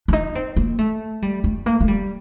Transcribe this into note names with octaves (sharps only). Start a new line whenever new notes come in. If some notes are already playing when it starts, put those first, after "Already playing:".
D4
D#4
C4
A#3
A3
G3
A3
A#3
A3
G3